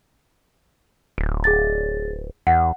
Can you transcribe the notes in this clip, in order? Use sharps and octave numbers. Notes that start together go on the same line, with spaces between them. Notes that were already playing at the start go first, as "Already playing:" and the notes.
D1
G#4 A6
E2 F#5